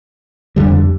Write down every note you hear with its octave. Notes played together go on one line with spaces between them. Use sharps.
F2 D3 G3